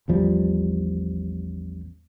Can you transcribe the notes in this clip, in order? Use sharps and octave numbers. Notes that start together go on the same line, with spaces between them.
A1 E2 F3 G3